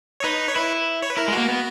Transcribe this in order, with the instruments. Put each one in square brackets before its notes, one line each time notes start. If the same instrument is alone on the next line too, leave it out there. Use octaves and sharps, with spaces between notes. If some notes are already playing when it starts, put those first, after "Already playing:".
[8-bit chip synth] C#5
[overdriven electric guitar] D#4 [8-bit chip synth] B4
[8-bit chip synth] C#5
[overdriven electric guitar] E4 [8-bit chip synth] B4
[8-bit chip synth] C#5
B4
[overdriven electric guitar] E4 [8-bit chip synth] A#4
[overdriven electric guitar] G#3
[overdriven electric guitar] A#3 [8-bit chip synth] F#4
[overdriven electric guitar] B3